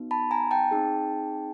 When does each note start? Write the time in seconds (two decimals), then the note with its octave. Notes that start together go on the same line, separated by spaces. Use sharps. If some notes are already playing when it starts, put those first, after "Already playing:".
Already playing: B3 D#4 F#4
0.11 A5 B5
0.31 G#5 A#5
0.51 G5 A5
0.71 C4 D#4 G#4